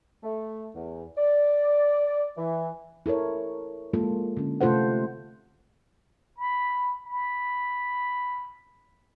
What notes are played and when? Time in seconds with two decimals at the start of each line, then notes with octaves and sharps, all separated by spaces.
0.24 A3
0.75 E2
1.17 D5
2.37 E3
3.06 E4 A4 A#4 C#5
3.93 G#3 A#3 F4 A4
4.37 D3 C#4
4.61 C3 A3 F4 A4 C5 F#5
6.37 B5
7.06 B5